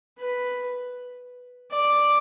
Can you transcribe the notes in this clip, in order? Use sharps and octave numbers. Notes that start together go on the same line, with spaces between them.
B4
D5